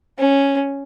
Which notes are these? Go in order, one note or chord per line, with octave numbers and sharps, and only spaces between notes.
C#4